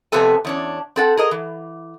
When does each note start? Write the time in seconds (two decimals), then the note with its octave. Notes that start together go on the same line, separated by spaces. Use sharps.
0.12 F2 C3 A3 B3 A4 G#5
0.45 E2 C#4 D4
0.96 C4 A4 F#5
1.17 G#4 A#4 D#5
1.31 E3